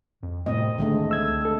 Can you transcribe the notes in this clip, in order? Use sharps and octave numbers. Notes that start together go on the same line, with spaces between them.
F2
A2 C3 A3 C4 D#5
C#2 D3 D#3 G#3 A3
E6 G#6
A4